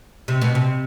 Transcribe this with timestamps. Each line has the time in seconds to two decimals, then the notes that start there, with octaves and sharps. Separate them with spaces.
0.28 C3
0.42 B2
0.55 C3